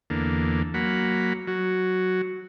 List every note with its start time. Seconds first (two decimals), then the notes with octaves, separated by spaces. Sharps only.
0.10 E2 D3 A#3
0.74 F#3 A#3 F#5 B5
1.48 F#3 F#4